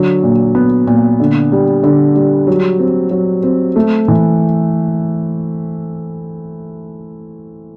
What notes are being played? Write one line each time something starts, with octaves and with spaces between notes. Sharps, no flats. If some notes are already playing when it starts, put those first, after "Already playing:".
Already playing: D3 F#3
A#2
B3
A#2
D3
G3
D3
G3
F#3
C4
F#3
C4
A3
E3